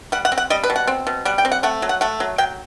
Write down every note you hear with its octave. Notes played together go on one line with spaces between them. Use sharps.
G3 F#5
F#5
C4
F#5
G3 D#5
B4
B2
F#5
C4
B2
G3 F#5
G5
C4
F#5
A3 F#5
F#3
F#5
A3 F#5
F#3
F#3 G5